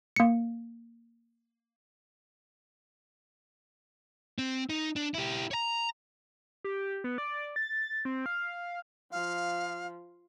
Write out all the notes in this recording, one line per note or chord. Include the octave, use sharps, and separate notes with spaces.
A#3 C#7
C4
D#4
D4
E4 G4
C#5 A#5
G4
B3
D5
A6
C4
F5
F3 F5